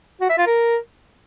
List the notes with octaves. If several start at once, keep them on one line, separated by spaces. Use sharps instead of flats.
F#4
E5
F4
A#4